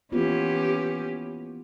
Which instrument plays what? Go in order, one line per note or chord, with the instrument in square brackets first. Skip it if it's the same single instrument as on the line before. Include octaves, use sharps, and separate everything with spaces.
[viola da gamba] E3 C#4 G4 [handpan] A#3 B3 F4